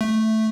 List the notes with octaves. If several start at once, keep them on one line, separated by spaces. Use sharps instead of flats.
A3